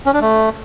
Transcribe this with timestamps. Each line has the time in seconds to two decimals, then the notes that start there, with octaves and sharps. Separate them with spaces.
0.06 C#4
0.13 D4
0.21 A3